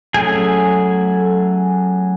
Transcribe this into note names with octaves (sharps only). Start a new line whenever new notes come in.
F#3 A3 C#4 G#4 G#5